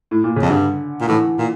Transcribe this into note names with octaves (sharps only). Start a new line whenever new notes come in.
A2
A#2
C#3
F2
G2 D3
A#2
A2 E3
A#2